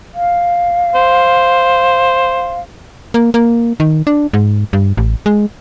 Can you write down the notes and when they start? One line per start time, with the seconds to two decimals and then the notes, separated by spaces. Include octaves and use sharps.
0.15 F5
0.95 C5
3.14 A#3
3.34 A#3
3.80 D#3
4.07 D4
4.33 G#2
4.73 G2
4.97 A1
5.26 G#3